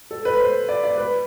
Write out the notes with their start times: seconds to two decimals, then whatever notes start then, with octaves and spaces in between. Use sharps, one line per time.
0.11 A4
0.25 B4
0.40 C5
0.69 D5
0.84 D5
0.98 B4